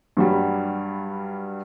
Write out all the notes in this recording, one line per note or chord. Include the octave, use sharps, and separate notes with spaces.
G2 F#3 G3